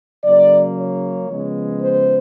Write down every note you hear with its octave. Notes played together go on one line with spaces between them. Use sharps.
C#3 F#3 A#3 D5
C#5
C#3 F3 G#3 B3
C5